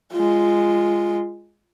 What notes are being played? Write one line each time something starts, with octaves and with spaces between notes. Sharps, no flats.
G#3 F4